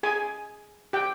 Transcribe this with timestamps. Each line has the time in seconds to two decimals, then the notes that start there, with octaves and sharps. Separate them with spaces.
0.03 G#4 G#5
0.93 G4 G5